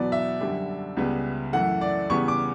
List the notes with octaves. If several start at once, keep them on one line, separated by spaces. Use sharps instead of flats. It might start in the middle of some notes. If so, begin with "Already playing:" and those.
Already playing: E2 B2 F#3 B3 D5
E5
F#2 D3 G3
C#2 C#3 G3 B3
F#2 E3 A3 F#5
D5
E2 C#3 G3 B3 C#6
D6